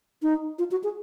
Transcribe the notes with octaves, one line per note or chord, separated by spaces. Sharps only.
D#4
F4
F#4
G#4